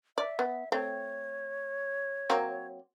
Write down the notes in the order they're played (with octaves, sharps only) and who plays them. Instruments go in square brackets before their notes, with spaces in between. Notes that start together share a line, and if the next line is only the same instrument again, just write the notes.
[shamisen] D5 [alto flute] E5
[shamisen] B3
[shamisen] A3 C4 G5 [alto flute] C#5
[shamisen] F#3 A#3 C4